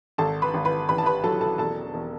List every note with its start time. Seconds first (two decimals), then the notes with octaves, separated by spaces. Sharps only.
0.18 G#1 A4 A5
0.42 B4 B5
0.54 G#1
0.65 B4 B5
0.89 A1 B4 B5
0.98 A5
1.06 B4 B5
1.24 F#3 A4 A5
1.41 A4 A5
1.58 E1 A4 A5
1.94 E1